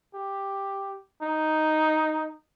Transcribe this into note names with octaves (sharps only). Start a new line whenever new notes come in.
G4
D#4